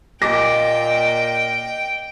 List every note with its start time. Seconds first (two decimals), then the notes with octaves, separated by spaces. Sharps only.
0.22 A#2 D#5 G5 D6 A#6